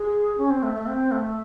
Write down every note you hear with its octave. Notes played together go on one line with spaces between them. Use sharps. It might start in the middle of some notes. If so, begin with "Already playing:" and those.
Already playing: G#4
C#4
C4
A3
A3
C4
A3